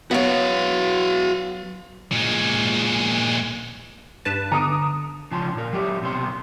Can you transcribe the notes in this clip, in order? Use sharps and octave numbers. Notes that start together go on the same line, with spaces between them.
F#3 B3 F#4 F5
A#2 G#3
G2 B4 A5
D3 A#5 D#6
C#3 F3 A5 C6
A#2 A#4
F#3 G4 D5 E5
B1 C3 B3 C6